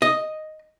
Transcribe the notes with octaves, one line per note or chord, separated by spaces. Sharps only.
D#5